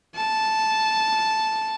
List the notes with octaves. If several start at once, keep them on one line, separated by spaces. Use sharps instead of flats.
A5